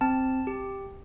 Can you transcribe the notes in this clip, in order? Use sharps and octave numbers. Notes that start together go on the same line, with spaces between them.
C4 A5
G4